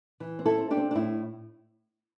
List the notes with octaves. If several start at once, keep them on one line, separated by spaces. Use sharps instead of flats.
E3
C4
E4 A4
C4
D4 G4
C4
D4
A2 E4